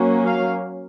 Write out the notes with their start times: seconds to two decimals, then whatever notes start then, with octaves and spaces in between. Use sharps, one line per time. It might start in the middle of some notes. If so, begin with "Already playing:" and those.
Already playing: F#3 A#3 C#4
0.26 F5